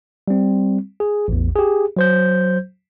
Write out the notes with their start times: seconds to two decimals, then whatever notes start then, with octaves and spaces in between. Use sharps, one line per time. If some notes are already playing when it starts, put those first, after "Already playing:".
0.28 G3 C4
1.00 G#4
1.28 A1 E2
1.56 G4 G#4
1.97 F#3 C5 G6